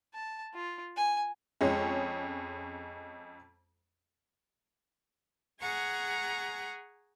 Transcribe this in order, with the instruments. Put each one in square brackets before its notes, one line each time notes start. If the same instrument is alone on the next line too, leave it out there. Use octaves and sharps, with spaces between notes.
[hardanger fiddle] A5
F4
G#5
[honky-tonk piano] F2 G#3 C#4
[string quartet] G#4 F#5 G#5 A#5 C#6